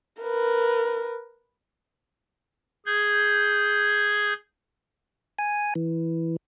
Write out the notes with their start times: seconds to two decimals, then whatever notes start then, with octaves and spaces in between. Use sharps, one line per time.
0.21 A#4 B4
2.86 G#4 G6 G#6
5.39 G#5
5.75 E3